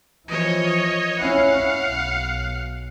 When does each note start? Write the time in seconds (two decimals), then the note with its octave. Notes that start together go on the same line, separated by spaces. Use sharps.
0.28 E3 F3 C#5 D#5
1.19 C#4 E4 F5 F#5
1.83 B1